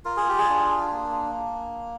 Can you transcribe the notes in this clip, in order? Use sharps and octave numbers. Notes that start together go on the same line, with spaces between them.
F4 A#4
G#4
G4
G#4
D4
A#3